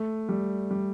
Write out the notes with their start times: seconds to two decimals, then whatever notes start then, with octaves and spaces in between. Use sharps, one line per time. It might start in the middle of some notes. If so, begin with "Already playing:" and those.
Already playing: A3
0.29 G3
0.71 G3